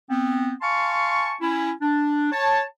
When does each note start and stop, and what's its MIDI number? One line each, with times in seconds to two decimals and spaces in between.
0.10 0.52 59
0.10 0.52 60
0.62 1.33 77
0.62 1.33 80
0.62 1.33 81
0.62 1.33 84
0.62 1.33 85
1.41 1.70 61
1.41 1.70 64
1.82 2.28 62
2.32 2.62 73
2.32 2.62 81